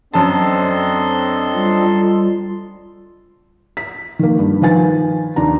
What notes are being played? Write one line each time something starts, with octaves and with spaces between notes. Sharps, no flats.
F#2 C4 D4 A4 D#5 A5 C6
G3 F4
B6
D#3 A#3
G2
D#3 F3 B4 G#5 A6
D#2 D4 A#5